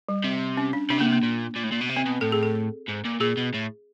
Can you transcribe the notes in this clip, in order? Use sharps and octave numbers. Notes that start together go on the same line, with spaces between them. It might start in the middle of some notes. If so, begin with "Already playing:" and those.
G3
C3
C#4
D4
C3 D4
C#3 A#3
C3
A#3
A#2
A#2
A2
A#2
B2
C3
C4
B2
A2 A4
G#4
A4
G#2
A#2
A#2 G#4
B2
A2